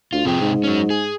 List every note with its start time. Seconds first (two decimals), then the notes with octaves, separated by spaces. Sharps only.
0.13 D2 F4
0.25 F2 C3 G#4 G5
0.41 G#2
0.64 F#3 C#4
0.90 G#4